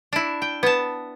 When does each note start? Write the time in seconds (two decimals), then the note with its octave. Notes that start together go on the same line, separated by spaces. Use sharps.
0.13 D4 E4
0.42 G5
0.63 B3 B4 A5